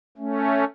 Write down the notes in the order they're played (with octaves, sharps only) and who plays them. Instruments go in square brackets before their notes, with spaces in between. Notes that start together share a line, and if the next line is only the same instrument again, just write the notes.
[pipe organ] A3 C#4